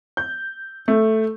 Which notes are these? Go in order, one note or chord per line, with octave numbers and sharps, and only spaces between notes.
G6
A3